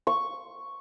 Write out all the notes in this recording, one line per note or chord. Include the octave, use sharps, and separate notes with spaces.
C#6